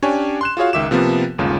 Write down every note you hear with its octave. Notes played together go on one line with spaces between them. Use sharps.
C#4 D4 G4 C#5 G#5
C6 F#6 E7
F4 F#4 G#4 C#5 F5
C#2 D#3 E5 D6 E7
C3 F3 A#3 B3
G1 D#2 C#3 G#3 F4